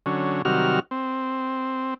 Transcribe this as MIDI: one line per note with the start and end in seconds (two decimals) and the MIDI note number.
0.06 0.42 50
0.06 0.42 54
0.06 0.42 61
0.45 0.80 48
0.45 0.80 51
0.45 0.80 54
0.45 0.80 55
0.45 0.80 66
0.45 0.80 89
0.91 1.94 60